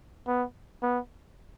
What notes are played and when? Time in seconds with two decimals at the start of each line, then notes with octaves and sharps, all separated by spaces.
0.27 B3
0.82 B3